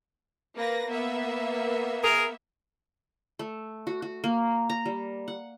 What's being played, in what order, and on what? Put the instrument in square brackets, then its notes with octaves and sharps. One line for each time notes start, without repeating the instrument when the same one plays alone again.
[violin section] A#3 B4 A#6
A#3 B3 E5
[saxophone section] G#4 A#4
[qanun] A3
F#4
F#4
A#3
A#5
G3
F#5